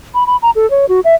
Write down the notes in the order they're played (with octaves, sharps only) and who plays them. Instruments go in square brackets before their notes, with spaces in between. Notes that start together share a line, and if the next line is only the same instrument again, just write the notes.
[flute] B5
B5
A#5
A4
C#5
F#4
E5